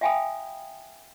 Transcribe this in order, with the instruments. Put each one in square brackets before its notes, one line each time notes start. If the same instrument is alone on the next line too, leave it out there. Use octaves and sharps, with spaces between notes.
[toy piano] E5 F5 G5 G#5 B5 D#6